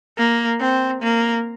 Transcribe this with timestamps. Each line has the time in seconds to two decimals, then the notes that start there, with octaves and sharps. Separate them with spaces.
0.18 A#3
0.61 C4
1.03 A#3